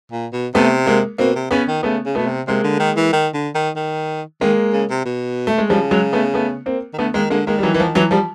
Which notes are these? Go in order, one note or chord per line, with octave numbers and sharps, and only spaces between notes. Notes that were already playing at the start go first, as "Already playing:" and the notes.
A#2
B2
C3 A3 B3
G#3 A#3
B2 A#3 C4
C3
C#3 B3 C#4
D#3
C#3 A3 B3
C#3
B2 A3 B3
C3
C3 G#3 A#3
D3
D#3
E3
D#3
D3
D#3
D#3
D#3 G#3 A#3
C#3
C3
B2
A3
G#3
C#3 F3 G3
F#3 G#3
A3 B3
A3 B3
A#3 C4
D#3
D3 A3 B3
D#3 G#3 A#3
D3 G#3 A#3
D#3 G#3 A#3
G3
E3 F#3
E3
F3
E3 F#3
F3 G3